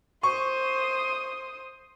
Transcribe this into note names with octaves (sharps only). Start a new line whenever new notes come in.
C5 C#6 D#6